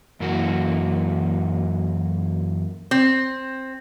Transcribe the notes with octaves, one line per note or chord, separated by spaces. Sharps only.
F#2 E3 A#3 F#4
C4